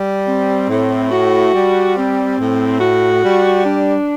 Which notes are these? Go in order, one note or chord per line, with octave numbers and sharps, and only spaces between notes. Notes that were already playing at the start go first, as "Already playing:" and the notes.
Already playing: G3
C4
A2
F#4
G3
C4
A2
F#4
G3
D4